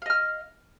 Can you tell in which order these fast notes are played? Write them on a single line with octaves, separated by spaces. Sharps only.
F5 D#5 F6